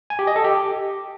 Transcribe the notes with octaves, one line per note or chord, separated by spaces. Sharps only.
G#5
G4
D#5
A4
G4